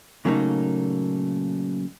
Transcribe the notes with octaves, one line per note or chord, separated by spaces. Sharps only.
A#2 C#3 F#3 A3 A#3 D#4